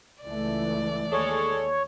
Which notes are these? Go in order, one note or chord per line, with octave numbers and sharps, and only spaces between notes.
C#2 E3 A3 D5
D#2 G#3 G#4 A4 C#5